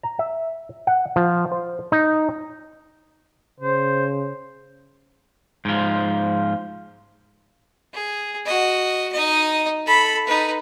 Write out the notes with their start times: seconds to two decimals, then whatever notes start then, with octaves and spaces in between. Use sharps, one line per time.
0.03 A#5
0.19 E5
0.87 F#5
1.16 F3
1.52 C5
1.92 D#4
3.60 C#3 C5
5.65 G#2 F3
7.93 G#4
8.46 F#4 D#5
9.12 D#4 D#5
9.86 A4 B5
10.27 D#4 B4